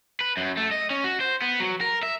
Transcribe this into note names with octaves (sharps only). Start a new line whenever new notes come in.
B4
F#2
A3
D#5
C#4
F#4
C5
B3
F#3
A#4
E5